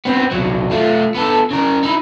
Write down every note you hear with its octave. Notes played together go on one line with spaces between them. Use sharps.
B3 C4
C2 F#3
A3 F4
B3 A4
C#3 A#4
D#4 E4